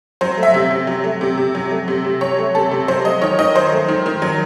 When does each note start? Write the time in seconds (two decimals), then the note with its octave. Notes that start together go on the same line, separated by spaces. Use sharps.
0.21 F#3 C5
0.37 A3
0.43 E5
0.54 C3
0.71 C3
0.87 F#3
1.04 A3
1.21 C3
1.38 C3
1.55 F#3
1.71 A3
1.88 C3
2.05 C3
2.21 F#3 C#5
2.38 A3
2.55 C3 A4
2.71 C3
2.88 F#3 C5
3.05 A3 D#5
3.22 D#3 C#5
3.39 D#3 D#5
3.55 F#3 C5
3.72 A3
3.88 D#3
4.06 D#3
4.22 F#3